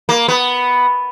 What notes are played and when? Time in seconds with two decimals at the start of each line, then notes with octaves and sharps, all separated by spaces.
0.09 A#3
0.28 B3